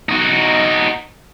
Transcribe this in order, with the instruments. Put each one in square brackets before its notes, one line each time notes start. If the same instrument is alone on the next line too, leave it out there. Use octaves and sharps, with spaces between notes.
[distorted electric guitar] D#4 F#4